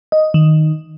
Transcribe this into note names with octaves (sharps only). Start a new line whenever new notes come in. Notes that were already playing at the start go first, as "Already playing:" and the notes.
D#5
D#3